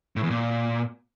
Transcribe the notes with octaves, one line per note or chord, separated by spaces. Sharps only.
A2
E2
A#2